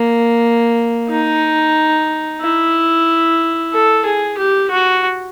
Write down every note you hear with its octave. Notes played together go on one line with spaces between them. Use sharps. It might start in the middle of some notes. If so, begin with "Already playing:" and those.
Already playing: A#3
D#4
E4
A4
G#4
G4
F#4